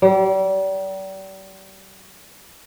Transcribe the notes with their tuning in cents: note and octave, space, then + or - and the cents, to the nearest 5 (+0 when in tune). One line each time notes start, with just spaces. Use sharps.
G3 -35